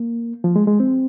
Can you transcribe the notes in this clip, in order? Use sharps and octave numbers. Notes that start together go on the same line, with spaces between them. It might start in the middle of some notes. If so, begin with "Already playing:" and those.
Already playing: A#3
F3
G#3
G#3
C4